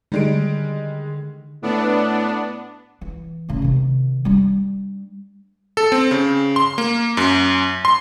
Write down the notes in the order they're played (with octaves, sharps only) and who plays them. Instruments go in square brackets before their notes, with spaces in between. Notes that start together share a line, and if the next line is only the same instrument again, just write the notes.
[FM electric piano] D3 D#3 [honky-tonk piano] G3 G#3 D7
[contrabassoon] A2 [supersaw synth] B3 D4
[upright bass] E3
A2 C#3
C3 D#3
G3 D4
[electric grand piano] A4
C4
C#3
C6
A#3
F#2
C6